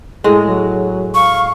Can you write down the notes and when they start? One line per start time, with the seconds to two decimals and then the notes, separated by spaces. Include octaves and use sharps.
0.24 A2 G#3 G#4
0.47 F#3
1.15 F5 C#6